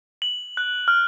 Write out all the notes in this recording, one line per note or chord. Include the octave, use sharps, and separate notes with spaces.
F#7
F#6
F6